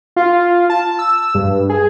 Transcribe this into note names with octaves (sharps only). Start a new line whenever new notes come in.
F4
A5
E6
G2
G#4